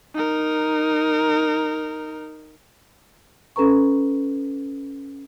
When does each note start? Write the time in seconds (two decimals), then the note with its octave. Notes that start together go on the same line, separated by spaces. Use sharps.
0.15 D#4 A#4
3.56 C#4 A4 B4 A#5 C#6